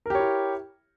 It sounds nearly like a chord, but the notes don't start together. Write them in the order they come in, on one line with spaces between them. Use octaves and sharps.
A#4 G4 C#5 E4